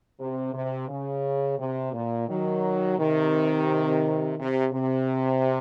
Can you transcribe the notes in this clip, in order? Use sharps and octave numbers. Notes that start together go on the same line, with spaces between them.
C3
C3
C#3
C3
A#2
D#3 F#3
C3 D#3
C3
C3